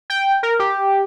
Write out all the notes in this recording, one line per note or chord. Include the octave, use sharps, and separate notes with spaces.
G5
A#4
G4